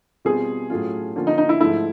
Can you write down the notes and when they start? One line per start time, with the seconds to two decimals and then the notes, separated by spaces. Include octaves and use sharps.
0.25 B2 G3 C4 F4 G#4
0.70 A2 F#3 A3 C#4 F4
1.16 D3 F3 A#3 C#4 F4
1.27 D#4
1.38 D#4
1.49 E4
1.60 G#2 F3 A3 E4